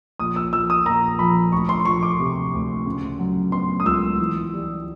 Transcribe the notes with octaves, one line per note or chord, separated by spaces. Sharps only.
A#1 D#6
E6
F3 E6
D#6
A#1 A#5
F3 B5
D2 C#6
C6
F3 C#6
D6
C3
D2
C#3
F#3
B3 C6
D#6
C#2 E6
E3
G3